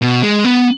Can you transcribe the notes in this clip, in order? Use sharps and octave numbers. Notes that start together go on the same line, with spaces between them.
B2
G#3
B3